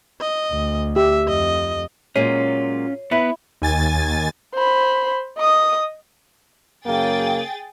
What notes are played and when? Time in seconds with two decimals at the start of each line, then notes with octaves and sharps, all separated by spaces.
0.20 D#5
0.52 D2
0.96 G4 E5
1.28 F2 D#5
2.16 A#2 F#3 G#3 C#4 F4 C#5 C7 D#7
3.11 B3 E4 B4
3.62 D#2 G#5 A6
4.54 C5 B5
5.38 D#5 D#6
6.85 F#2 C#3 A#3 G#4 G5 A6